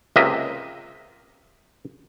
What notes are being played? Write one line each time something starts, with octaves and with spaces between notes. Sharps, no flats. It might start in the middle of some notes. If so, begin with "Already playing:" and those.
C#2 C3 A#3 D#5 E5